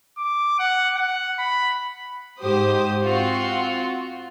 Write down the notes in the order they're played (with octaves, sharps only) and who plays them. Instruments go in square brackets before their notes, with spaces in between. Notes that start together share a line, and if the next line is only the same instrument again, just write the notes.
[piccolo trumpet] D6
F#5
F#5
B5
[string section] G#2 G4 C5 D#6
C4 F4 F#4